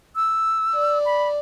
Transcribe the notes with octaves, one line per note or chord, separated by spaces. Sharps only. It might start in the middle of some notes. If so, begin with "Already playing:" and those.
E6
D5
B5